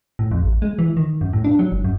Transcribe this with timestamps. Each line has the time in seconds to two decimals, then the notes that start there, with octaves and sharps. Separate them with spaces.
0.19 A2
0.31 F2
0.43 A1
0.62 G#3
0.79 E3
0.97 D#3
1.21 F#2
1.33 A2
1.44 D4
1.59 F#3
1.72 F#1
1.84 F#2